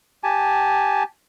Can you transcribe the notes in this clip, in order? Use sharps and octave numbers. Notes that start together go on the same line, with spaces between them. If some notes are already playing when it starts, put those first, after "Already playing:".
G4 G#5 A5